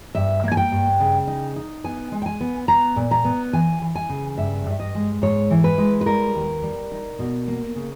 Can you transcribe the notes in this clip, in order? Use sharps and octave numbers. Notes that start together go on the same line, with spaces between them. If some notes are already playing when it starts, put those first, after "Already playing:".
G2 E5
A#3
G#5
G5
G2
C#3
D#4
D#4
B3 G#5
G#3
G5
G#5
B3
B3 A#5
A#2
A#5
B3
E3 G#5
E3
G#5
C#3
G2 E5
G2
E5
D#5
G#3
G#2 C#5
E3
B4
G#3
B4
G3 A#4
D#2
G3
D#4
B2
A#3
C#3